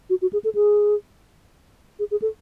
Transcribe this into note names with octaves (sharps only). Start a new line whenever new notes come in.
F#4
F#4
G#4
A4
G#4
G#4
G#4
A4